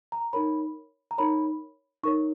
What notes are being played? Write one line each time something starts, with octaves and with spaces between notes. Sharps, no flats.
A#5
D#4 A#4 C#5 B5
A#5
D#4 A#4 C#5 B5
D#4 A#4 C#5 C#6